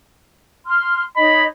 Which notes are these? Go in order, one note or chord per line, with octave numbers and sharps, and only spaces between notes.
C6 F6
D#4 C#5 D#5 B5